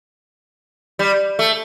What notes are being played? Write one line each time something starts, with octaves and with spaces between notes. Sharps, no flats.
G3
A3